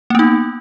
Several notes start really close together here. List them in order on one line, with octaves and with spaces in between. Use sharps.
A#3 B3 D#4